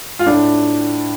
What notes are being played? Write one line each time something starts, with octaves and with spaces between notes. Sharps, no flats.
F4
A2 D4